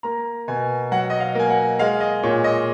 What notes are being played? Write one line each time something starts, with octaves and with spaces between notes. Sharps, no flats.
A#3 A#5
B2 G#5
F#3 F#5
D#5
F5
A#3 G#5
F#5
G#3 F5
D#5
A#2 C#5
D#5